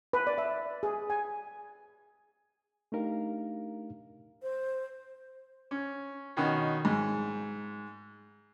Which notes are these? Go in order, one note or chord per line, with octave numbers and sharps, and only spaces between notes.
B4
D5
E5
G#4
G#5
A3 D4 D#4 G4 A#4 F5
C5
C#4
B2 D#3 C#4 F#4
G#2